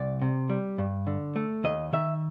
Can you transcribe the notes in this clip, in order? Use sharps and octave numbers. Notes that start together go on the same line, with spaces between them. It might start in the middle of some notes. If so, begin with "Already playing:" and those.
Already playing: C2 D5
C3
G3
G2
D3
A3
D#2 D#5
D#3 E5